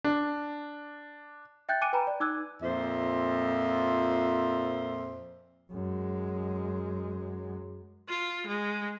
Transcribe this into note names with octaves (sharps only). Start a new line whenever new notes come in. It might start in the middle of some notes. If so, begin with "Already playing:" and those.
D4
E5 G5 F#6 G6 A6
G#5 D6 F#6 C#7 D#7
B4 G5 G#5 A#5 B5
D5
D#4 D6 E6 F#6 G#6
F2 A#2 C5 E5
F#2 G#3
F4
G#3